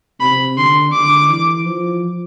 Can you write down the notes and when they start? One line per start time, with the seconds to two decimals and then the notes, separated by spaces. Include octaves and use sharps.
0.20 C3 B5
0.57 D3 C6
0.93 D3 D6
1.29 E3
1.66 F3